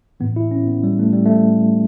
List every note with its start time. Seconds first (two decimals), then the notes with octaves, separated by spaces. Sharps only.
0.20 A2 E3 B3
0.36 E4
0.51 C#4
0.67 B3
0.83 G3
0.99 A3
1.13 G3
1.25 A3